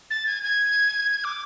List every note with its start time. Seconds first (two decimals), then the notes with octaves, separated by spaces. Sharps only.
0.10 A6
0.26 G#6
0.43 G#6
1.24 D6